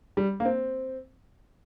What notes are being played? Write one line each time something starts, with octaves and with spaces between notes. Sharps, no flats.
G3
A#3
C4